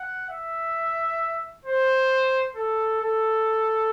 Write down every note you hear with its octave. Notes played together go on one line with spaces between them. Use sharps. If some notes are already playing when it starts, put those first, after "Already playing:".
Already playing: F#5
E5
C5
A4
A4